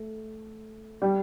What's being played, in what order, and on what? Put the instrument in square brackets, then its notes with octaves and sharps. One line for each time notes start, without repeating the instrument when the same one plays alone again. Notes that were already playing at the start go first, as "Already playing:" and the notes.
Already playing: [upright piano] A3
G3